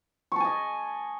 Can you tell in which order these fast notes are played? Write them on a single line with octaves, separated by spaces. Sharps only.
C#6 A5 G#5 D#5